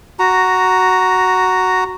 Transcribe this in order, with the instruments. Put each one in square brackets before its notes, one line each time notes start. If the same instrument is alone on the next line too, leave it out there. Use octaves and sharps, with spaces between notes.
[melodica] F#4 A#5